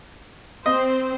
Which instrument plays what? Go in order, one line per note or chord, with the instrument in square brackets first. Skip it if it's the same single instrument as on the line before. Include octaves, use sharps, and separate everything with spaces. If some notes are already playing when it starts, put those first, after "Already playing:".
[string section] C4 C5 [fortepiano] D#5